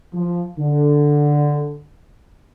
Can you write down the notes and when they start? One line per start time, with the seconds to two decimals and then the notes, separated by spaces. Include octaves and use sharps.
0.14 F3
0.59 D3